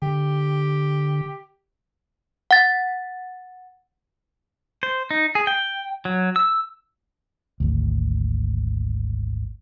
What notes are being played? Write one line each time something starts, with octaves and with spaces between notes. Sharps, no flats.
D3 G4
F#5 A6
C5
D#4
G#4
G5
F#3
E6
G#1 D2